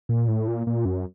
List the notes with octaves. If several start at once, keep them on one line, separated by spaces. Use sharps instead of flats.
A#2
A2
A#2
A#2
F#2